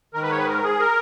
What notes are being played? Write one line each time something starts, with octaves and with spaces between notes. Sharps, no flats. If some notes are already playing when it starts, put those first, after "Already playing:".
G#2 D#3 A#4
B4
C#5
B4
A#4
G#4
A#4